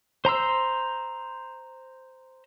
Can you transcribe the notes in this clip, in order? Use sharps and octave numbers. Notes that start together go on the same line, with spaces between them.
C5 A#5 C6 E6